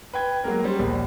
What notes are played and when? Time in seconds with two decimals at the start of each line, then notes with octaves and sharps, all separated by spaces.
0.13 B4 G5 G#6
0.44 F#3 G#3 A#3 A#4
0.64 G3 C#4 C5
0.79 D#1 A#1